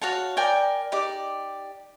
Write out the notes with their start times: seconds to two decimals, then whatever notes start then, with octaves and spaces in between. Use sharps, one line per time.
0.02 F#4 C#5 F5 A5
0.37 A#4 D5 G5 G#5
0.92 D#4 G4 D5 D6